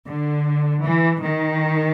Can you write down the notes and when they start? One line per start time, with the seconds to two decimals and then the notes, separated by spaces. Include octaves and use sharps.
0.09 D3
0.85 E3
1.24 D#3